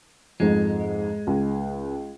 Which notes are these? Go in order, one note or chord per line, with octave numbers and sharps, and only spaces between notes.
F2 G#2 G#3
C#2